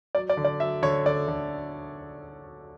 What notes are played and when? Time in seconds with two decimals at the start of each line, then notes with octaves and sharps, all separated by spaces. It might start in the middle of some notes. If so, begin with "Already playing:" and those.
0.15 F#3 D5
0.29 D5
0.37 D3
0.45 D5
0.60 F#3 E5
0.82 D3 C#5
1.06 D3 D5
1.28 D3